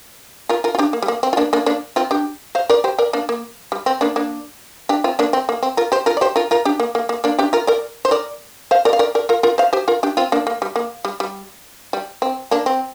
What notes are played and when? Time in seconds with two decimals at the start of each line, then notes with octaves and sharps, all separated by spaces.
0.49 F4 A#4
0.64 F4 A#4
0.75 F4
0.79 D4 G4
0.93 A#3
1.02 G3
1.08 A#3
1.23 C4
1.33 F4
1.37 A#3 D4
1.53 A#3 D4
1.66 A#3 D4
1.96 C4 F4
2.11 D4 G4
2.55 C5 F5
2.70 A#4 D5
2.84 G4 C5
2.98 A#4 D5
3.13 A#3 D4
3.29 A#3
3.72 G3
3.86 C4
4.01 A#3 D4
4.16 A#3 D4
4.89 D4 G4
5.04 C4 F4
5.19 A#3 D4
5.33 C4
5.49 A#3
5.63 C4
5.77 F4 A#4
5.92 G4 C5
6.06 F4 A#4
6.17 D5
6.21 G4 C5
6.36 F4 A#4
6.51 F4 A#4
6.65 D4 G4
6.80 A#3
6.95 A#3
7.09 A#3
7.24 A#3 D4
7.39 D4 G4
7.53 F4 A#4
7.67 A#4 D5
8.05 C5
8.11 A#4 D5
8.71 C5 F5
8.85 A#4 D5
8.93 F5
8.99 A#4 D5
9.15 A#4 D5
9.29 F4 A#4
9.43 F4 A#4
9.58 C5 F5
9.73 G4 C5
9.88 F4 A#4
10.03 D4 G4
10.17 C4 F4
10.32 A#3 D4
10.47 A#3
10.62 G3
10.76 A#3
11.05 G3
11.20 G3
11.93 G3
12.22 C4
12.51 A#3 D4
12.66 C4